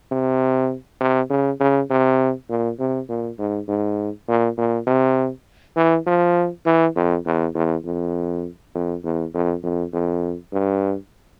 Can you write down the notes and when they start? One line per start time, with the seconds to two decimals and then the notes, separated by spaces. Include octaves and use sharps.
0.12 C3
1.00 C3
1.30 C#3
1.60 C#3
1.90 C3
2.49 A#2
2.79 C3
3.09 A#2
3.39 G#2
3.68 G#2
4.28 A#2
4.58 A#2
4.87 C3
5.77 E3
6.07 F3
6.66 E3
6.96 F2
7.26 E2
7.55 E2
7.85 F2
8.75 F2
9.04 E2
9.34 F2
9.63 F2
9.93 F2
10.53 G2